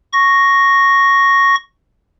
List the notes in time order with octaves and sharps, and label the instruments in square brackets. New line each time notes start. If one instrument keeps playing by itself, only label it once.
[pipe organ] C#6 A#6